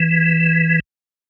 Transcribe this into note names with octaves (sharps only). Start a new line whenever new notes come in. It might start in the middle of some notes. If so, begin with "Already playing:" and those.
Already playing: E3